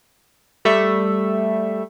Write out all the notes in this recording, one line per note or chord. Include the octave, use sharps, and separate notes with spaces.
G3 A3 E5